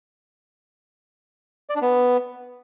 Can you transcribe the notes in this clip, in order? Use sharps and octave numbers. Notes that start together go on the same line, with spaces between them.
D5
D4
B3